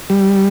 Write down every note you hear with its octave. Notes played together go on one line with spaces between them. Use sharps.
G3